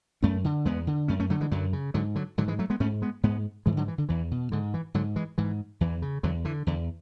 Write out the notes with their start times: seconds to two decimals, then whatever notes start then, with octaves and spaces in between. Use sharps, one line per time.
0.22 F#2 A3 C#4
0.44 D3
0.65 E2 G#3 B3
0.87 D3
1.08 F#2 A3 C#4
1.20 A3 C#4
1.30 D3 F#3 A3
1.41 E3 G#3
1.51 F#2 D3 F#3
1.73 C#3
1.94 G#2 D3 F#3
2.15 D3 F#3
2.38 G#2 D3 F#3
2.48 E3 G#3
2.59 F#3 A3
2.70 G#3 B3
2.80 G#2 A3 C#4
3.02 G#3 B3
3.23 G#2 G#3 B3
3.66 G#2 E3 G#3
3.77 D3 F#3
3.88 E3
3.98 D3
4.09 E2 E3
4.31 B2
4.52 G#2 D3
4.74 E3
4.94 G#2 D3 F#3
5.16 E3 G#3
5.38 G#2 E3
5.81 E2 E3
6.02 C#3
6.23 E2 D3 F#3
6.45 D3 E3
6.67 E2 D3